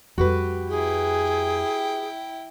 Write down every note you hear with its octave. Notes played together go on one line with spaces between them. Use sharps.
F2 G3 F#4 G4 B4
E4 G#4 G5